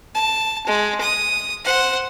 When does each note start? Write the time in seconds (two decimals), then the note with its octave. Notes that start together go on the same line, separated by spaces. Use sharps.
0.15 A5
0.67 G#3
1.01 D#6
1.65 C5 F#5